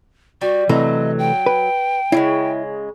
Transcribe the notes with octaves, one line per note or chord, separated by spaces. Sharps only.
G3 F#4
C3 E3 F#3 A3 D#5
G5
B4
C#3 E3 G#3 E4